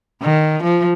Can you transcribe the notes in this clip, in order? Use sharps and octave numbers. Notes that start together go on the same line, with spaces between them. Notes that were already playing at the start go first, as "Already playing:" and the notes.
D#3
F3